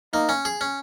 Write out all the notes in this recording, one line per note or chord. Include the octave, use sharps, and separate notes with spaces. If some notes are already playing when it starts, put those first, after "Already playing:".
A#3 D#4
C#4
G#4
C#4